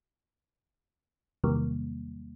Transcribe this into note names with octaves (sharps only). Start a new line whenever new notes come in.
E2 C3 D#3 F#3 G3 A#3